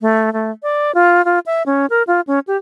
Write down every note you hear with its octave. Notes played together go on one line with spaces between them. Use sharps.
A3
A3
D5
F4
F4
E5
C#4
A#4
F4
C#4
G4